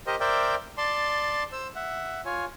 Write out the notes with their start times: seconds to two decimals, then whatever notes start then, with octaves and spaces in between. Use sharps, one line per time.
0.07 G4 A#4 C5 D#5
0.20 A#4 C5 D5 E5 G5
0.78 D5 A5 C6
1.52 C5 E6
1.75 E5 F#5
2.25 F4 C#5 G#5